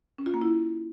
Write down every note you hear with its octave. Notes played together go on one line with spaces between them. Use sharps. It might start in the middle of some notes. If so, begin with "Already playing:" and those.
C#4
F4
A#3
E4